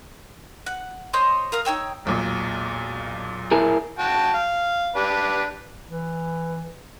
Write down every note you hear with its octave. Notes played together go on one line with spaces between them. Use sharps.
F#5
C5 C#5 D#5 C6
A#4 F5 D#6
D#4 C#5 G5 E6
E1 B1 A#2
E4 G#4 A#4
F#4 G5 A5
F5
D4 G4 B4
E3